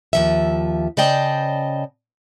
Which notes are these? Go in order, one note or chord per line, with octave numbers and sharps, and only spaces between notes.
D#2 F3 E5
C#3 C5 D5 D#5 G5 A5